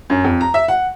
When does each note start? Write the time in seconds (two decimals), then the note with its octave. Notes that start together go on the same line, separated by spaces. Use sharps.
0.10 F#2
0.24 F2
0.41 A#5
0.54 E5
0.68 F#5